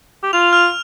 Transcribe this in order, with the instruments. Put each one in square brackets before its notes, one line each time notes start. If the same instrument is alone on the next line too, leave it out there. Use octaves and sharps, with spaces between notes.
[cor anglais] G4
[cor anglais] F4 [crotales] F7
[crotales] F6